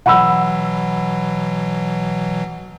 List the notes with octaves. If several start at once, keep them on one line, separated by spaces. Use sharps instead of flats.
B2 E3 F#3 F#5 B5 E6